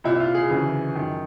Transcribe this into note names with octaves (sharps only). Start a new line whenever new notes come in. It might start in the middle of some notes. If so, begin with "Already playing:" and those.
C2 A#2 E4
F4
G#4
D2 C#3 E3
F#2 D#3